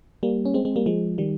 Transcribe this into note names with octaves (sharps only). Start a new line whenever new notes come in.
G3 A#3
C#4
G#3 C4
G#3 C4
G3 A#3
F3 G#3
D#3 G3